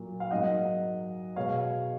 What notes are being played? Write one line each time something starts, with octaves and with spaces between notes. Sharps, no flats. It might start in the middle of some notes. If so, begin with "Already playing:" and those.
Already playing: A#2 F#3 A#3
F5
G#2 F#3 A#3 D#5 F#5
B2 G#3 C#5 F5